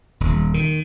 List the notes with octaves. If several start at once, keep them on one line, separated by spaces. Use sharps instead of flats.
D#1
D#3